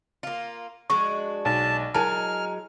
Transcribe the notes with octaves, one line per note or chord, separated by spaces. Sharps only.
A#3 F4
G#3 D4 F#4 C#6
B1 A5
F#3 G#3 E4 A#4 G#5 A5 F6